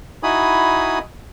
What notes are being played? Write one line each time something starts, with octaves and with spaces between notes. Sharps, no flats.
D#4 E4 F#4 G#5 B5 D#6